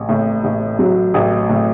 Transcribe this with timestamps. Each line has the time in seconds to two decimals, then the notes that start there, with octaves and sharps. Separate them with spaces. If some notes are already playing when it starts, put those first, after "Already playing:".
Already playing: A1
0.09 A2
0.44 A1
0.79 F#3
1.14 A1
1.49 A2